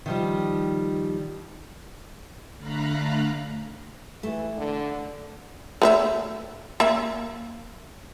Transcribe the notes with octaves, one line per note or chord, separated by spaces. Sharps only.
D#3 F3 G3
D3 A3 F5 A#5 B5 F#6
E3 A3
D3
A3 B4 E5
A#3 E5